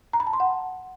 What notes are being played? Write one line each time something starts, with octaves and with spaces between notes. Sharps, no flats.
A#5
B5
A5
C6
F#5